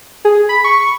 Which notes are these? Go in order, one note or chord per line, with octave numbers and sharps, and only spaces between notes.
G#4
B5
C#6